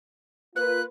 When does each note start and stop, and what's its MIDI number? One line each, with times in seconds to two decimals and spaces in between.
0.56 0.82 58
0.56 0.82 65
0.56 0.82 71
0.56 0.82 90